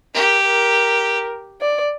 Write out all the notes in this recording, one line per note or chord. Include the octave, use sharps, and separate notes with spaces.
G4 A#4
A#4
D5